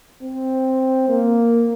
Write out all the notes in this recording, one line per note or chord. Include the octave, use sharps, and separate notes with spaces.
C4
A#3